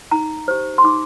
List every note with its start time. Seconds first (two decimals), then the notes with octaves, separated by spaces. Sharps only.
0.11 D#4 A#5
0.48 G4 C5
0.78 C6
0.84 D#4 D6